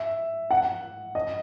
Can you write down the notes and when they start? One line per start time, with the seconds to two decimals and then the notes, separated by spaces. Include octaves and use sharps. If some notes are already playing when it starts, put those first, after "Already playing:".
Already playing: E5
0.51 F#5
1.15 D#5